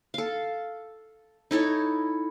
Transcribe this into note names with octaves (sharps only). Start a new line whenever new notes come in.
A4 F5
D#4 E4 A4 C#5